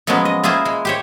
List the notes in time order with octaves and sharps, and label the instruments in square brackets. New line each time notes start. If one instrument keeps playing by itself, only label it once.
[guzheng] F3 F#3 G#3 A#3 B3 C#4
D#5
A#3 E4 F4 G#4 C5
G#3
G4 C5 C#5